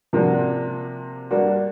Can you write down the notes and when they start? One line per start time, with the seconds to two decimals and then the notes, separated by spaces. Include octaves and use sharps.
0.13 C3 F3 A#3 D4 F#4
1.31 G3 A#3 D4 F#4